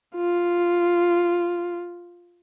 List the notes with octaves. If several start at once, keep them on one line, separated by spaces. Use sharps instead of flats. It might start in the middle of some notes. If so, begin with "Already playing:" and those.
F4